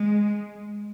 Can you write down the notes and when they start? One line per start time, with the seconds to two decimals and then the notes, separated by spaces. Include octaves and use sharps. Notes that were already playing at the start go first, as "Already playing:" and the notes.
Already playing: G#3